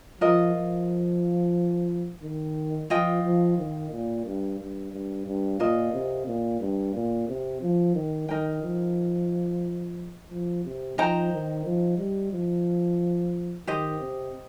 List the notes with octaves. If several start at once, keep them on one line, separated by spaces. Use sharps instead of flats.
F3 F4 A#4 D#5
F3
D#3
F3 F4 D#5 G5
F3
D#3
A#2
G2
G2
G2
G2
A#2 F4 A#4 D#5
C3
A#2
G2
A#2
C3
F3
D#3
D#3 D#4 A#4 G5
F3
F3
C3
F3 D#4 C5 G5 A#5
D#3
F3
G3
F3
D#3 G4 C5 D#5
C3